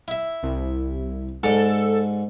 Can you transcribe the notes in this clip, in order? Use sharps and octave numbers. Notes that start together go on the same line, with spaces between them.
E4 E5
C2
G#2 A4 D5